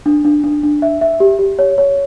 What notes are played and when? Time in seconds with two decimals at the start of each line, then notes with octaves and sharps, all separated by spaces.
0.06 D4
0.25 D4
0.44 D4
0.63 D4
0.82 E5
1.01 E5
1.20 G4
1.39 G4
1.59 C#5
1.78 C#5